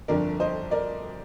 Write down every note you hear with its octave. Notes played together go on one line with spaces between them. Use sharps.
G1 F2 D3 A#4 D5
C5 D#5
A#4 D5